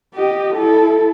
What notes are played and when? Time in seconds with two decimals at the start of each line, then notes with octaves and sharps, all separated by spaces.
0.15 G4 D#5
0.54 E4 A4